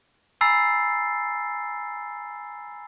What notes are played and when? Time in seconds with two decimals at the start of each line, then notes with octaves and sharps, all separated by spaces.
0.41 G#5 A#5 B5 E6 A6 C7